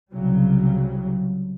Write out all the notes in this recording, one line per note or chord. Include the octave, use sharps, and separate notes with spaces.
C2 C#3 F#3 G3